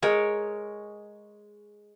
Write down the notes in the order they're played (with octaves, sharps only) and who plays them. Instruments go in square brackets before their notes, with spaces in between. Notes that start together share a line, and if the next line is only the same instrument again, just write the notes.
[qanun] G#3 A#4 C#5